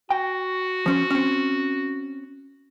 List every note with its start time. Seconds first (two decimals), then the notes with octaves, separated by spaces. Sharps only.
0.10 F#4 G5
0.86 F3 C#4 C5
1.11 C4 C#4